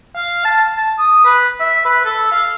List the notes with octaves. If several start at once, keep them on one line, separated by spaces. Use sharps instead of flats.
F5
A5
A5
D#6
B4
E5
B4
A4
F5